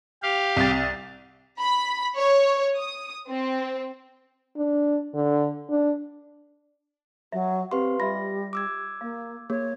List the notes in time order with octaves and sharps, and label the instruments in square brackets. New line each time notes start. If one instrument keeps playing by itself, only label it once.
[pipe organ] G4 F5
[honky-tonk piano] C2 A6
[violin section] B5
C#5
D#6
C4
[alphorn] D4
D3
D4
[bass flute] F#3 [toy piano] E5
[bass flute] C4 [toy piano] G4 [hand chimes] B4 F5 C6
[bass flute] G3 [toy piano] F4 D#5 E5 [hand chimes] A#6
[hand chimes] D6 E6 G#6
[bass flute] A#3 [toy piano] F5
[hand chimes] A#3 [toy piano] G#4 [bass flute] C#5